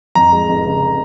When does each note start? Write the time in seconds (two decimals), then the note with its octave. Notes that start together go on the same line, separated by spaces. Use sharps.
0.15 F2 A#5
0.32 G#3
0.49 F1
0.65 C#3